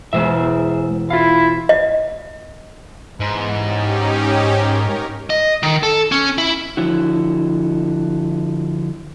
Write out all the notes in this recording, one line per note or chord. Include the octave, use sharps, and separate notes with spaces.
E1 G#3 C5 E5
E4 F4 F5
D#5
G#2 E3 B3
C#4 D#4 G4
A#4 C#5
D#5
D#3
A4
C#4
E4
D3 F3 E4 F#4